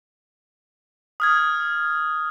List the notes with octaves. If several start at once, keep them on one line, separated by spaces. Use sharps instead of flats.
D#6 F6 G#6